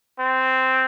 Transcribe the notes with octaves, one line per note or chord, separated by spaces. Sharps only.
C4